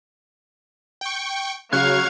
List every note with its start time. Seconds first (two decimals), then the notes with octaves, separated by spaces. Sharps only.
1.01 G5 C#6
1.73 C#3 F#3 F5 C#6 F#6 G#6